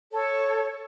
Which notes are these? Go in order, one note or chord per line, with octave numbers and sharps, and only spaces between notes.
A4 C#5